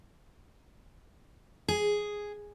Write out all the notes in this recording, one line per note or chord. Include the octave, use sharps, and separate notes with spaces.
G#4